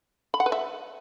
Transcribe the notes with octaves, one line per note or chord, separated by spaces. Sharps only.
B5
F#5
B4
E5